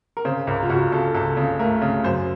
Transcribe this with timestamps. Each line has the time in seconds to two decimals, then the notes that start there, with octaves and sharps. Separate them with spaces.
0.17 A#4
0.25 C#3 C5
0.47 C#2 A#4
0.63 F4
0.70 C#2 F#4
0.92 C#3 A4
1.14 C#2 A4
1.37 C#3
1.59 A3 A#4
1.82 C#3
2.04 F#2 C5